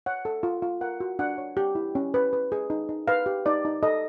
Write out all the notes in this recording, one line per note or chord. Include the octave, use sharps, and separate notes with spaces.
C#5 F#5
A4
F4
F4
A#4 F#5
F#4
D4 F#5
C#5
G4
E4
C#4
B4
B4
G#4
D#4
D#4
B4 F5
G4
D#4 D5
D#4
A4 D#5